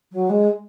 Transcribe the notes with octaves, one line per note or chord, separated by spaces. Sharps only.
F#3
G#3